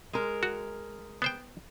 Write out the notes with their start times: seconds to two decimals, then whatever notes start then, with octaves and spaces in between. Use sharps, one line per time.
0.13 G#3 A#4
0.43 F#4
1.22 B3 C5 G5